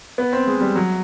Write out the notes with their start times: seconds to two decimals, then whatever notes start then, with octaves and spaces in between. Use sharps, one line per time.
0.18 B3
0.33 C4
0.47 G#3
0.61 G3
0.76 F#3